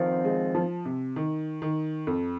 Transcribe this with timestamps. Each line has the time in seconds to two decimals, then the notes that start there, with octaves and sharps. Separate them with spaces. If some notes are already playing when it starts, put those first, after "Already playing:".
Already playing: F2 D#3 C4 F4
0.25 G#3
0.55 F3
0.85 C3
1.16 D#3
1.62 D#3
2.07 F2